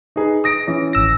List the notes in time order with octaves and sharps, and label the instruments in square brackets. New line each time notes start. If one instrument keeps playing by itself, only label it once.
[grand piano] D#4 G#4 B4
D#6 A#6 D7
E3 C#4
[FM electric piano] G#1 E6 A#6